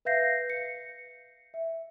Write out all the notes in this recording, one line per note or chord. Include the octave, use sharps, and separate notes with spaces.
B4 E5 F5 G6 A#6 C7
C#7
E5